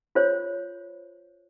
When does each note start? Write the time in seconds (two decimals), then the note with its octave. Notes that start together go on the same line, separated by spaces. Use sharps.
0.15 F4 C5 C#5